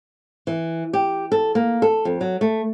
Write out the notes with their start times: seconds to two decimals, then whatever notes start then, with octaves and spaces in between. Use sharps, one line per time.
0.47 E3
0.93 G4
1.32 A4
1.55 A#3
1.82 A4
2.05 F2
2.21 F#3
2.41 A3